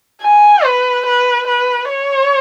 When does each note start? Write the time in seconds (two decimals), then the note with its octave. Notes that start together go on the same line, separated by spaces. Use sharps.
0.22 G#5
0.64 B4
1.06 B4
1.47 B4
1.90 C#5